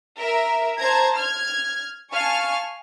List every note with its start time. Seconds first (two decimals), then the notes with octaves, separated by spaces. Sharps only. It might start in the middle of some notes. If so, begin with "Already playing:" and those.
0.19 A#4 E5
0.79 C5 A5 A#5 G#6
1.17 F6 G#6
2.12 F5 G#5 A5 C#6 F6